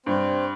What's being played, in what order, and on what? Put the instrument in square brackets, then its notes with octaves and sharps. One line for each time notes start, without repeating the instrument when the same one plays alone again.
[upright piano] G2 [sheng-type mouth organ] C4